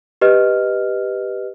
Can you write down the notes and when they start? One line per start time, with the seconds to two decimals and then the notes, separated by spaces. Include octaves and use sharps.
0.21 G4 B4 D#5 F6